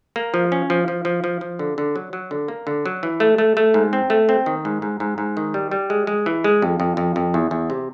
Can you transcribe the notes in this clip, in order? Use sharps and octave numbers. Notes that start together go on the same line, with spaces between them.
A#3
F3
C#4
F3
F3
F3
F3
F3
D3
D3
F#3
F#3
D3
A#3
D3
F#3
E3
A3
A3
A3
G#2
C4
A3
C4
D#3
G#2
G#2
G#2
G#2
D#3
G3
G3
G#3
G#3
E3
G#3
F2
F2
F2
F2
E2
E2
C3